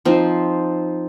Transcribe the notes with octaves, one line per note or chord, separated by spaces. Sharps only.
F3 C4 D#4